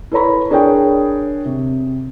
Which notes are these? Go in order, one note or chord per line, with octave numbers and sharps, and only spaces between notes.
E4 A4 B4 C#5 A#5 B5
D4 G#4 A#4 C#5 G5
C3